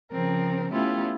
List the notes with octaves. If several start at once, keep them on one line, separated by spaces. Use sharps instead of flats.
C#3 F3 C4 A#4
A3 B3 C#4 E4 F4 G4